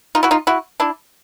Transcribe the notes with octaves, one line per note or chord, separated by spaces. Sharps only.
D#4 F4
E4 F#4
D#4 F4
E4 F#4
D4 E4